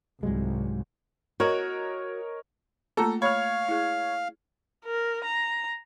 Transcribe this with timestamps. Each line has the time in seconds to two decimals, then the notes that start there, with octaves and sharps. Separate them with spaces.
0.23 C2 G#2 F#3 G#3
1.40 F#4 A#4 C#5 D#5
2.97 A3 A#3 F4 A4 A#5
3.22 C#5 F5 B5 F6
3.69 E4 G#4
4.85 A#4
5.24 A#5